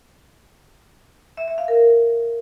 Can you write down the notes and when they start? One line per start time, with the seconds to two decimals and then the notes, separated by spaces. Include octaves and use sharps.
1.37 E5
1.48 E5
1.58 F5
1.68 A#4